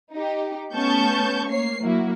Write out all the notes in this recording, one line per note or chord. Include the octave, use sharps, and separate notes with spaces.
D#4 G4
A3 B3 C#4 A5 C#6 G6
A#3 C#5 C7
F#3 A#3 E4 F#4